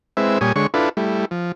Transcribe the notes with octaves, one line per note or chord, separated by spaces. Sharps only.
G#3 C4 E4 B4 E5
A#2 G3 C#5 G#5 D#6
D3 G#3 C#5 C#6
D4 E4 F4 A4 B4
G3 A3 E4
F3